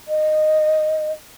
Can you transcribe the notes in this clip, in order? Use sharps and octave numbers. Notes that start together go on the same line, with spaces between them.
D#5